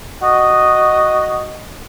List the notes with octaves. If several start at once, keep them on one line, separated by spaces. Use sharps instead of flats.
F#4 D#5